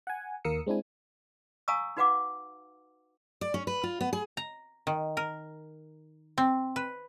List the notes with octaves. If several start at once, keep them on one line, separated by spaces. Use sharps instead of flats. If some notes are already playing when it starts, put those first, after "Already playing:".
F#5 G#5
D#2 A#4 F5 D#6 E6 C#7
G#3 C4 D4 E4 G#5
F5 G#5 A#5 C#6 D#6 E6
D#4 F#4 B4 F5 F#5 D6
D5
C#4
B4
F4
B3
G#4
A#5
D#3
A#4
C4
B4